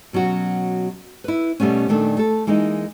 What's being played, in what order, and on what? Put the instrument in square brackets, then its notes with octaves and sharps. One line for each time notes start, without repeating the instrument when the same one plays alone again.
[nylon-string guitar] B2 F#3 C#4 F#4
E4 B4
B2 G3 A3 B3 C#4
A#2 D#3 A3 D4
A3 A4
E3 G#3 A#3 D#4